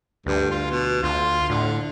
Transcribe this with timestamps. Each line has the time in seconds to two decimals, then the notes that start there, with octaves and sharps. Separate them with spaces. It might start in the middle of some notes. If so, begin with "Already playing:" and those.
0.26 D2 G2
0.51 F4
0.71 B2
1.03 D2 F4
1.50 A2 D3